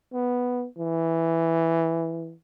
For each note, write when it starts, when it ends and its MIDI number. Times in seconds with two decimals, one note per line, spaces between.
0.13 0.66 59
0.78 2.34 52